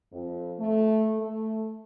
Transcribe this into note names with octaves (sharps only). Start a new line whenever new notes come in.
F2
A3
A3